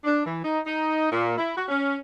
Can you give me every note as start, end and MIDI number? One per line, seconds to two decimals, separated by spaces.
0.04 0.21 62
0.25 0.39 52
0.43 0.58 63
0.67 1.08 63
1.11 1.35 46
1.37 1.55 64
1.57 1.65 66
1.68 1.96 61